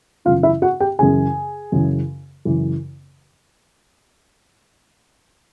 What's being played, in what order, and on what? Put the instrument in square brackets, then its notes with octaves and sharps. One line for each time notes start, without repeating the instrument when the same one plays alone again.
[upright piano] F#2 C#3 E3 F4 F5
E4 E5
F#4 F#5
G4 G5
F#2 C#3 E3 G#4 G#5
F#2 C#3 E3
F#2 C#3 E3